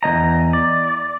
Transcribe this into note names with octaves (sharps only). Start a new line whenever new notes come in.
E2 A#3 D#5 A#5
D5